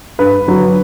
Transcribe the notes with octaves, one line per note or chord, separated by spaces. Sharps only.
G2 B4
D3 F#3